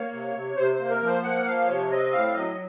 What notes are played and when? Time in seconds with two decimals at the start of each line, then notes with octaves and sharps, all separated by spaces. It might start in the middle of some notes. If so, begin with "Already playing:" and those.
Already playing: A#3 C#5
0.12 C3
0.34 C3
0.56 C3 C5
0.73 C5
0.79 A#3
0.90 A#4
1.01 F3
1.06 C5
1.23 A#3 F#5
1.45 F3 F5
1.68 C3 C#5
1.90 C4 D#5
2.12 A2 F5
2.34 F#3 D#5